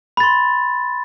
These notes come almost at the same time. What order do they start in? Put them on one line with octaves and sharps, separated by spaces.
B5 A6 C6